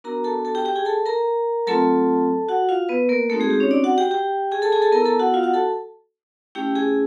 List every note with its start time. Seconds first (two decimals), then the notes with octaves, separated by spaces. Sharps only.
0.04 B3 D4 F#4 A#4 A#5
0.24 A4 A5
0.45 A4 A5
0.55 G4 G5
0.65 G4 G5
0.76 G#4 G#5
0.85 A4 A5
1.06 A#4 A#5
1.67 F#3 A3 C4 F4 A4 A5
2.49 F#4 F#5
2.69 F4 F5
2.89 B3 B4
3.09 A#3 A#4
3.30 A3 C4 D#4 F#4 A4
3.40 G#3 G#4
3.50 G4
3.60 C#4 C#5
3.71 D4 D5
3.84 F#4 F#5
3.98 G4 G5
4.11 G4 G5
4.52 G#4 G#5
4.62 A4 A5
4.72 G#4 G#5
4.82 A4 A5
4.92 B3 E4 A#4 A#5
5.06 A4 A5
5.19 F#4 F#5
5.34 F4 F5
5.43 F#4 F#5
5.54 A4 A5
6.55 A3 C#4 E4 G4 G5
6.75 G#4 G#5